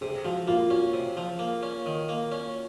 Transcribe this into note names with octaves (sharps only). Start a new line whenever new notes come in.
C3 G#4
F3 F#4
A#3 F4
C#4 F#4
C3
F3
A#3
C#4
D#3
A#3
C#4